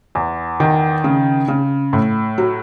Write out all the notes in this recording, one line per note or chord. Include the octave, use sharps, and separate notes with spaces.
E2
D#3
C#3
C#3
A2
F#3